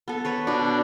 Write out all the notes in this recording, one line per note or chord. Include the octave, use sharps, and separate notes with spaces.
B3 A4
B4 C#5 B5
B2 B3 D4